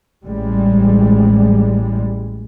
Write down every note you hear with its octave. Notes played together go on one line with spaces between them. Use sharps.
A1 G3 G#3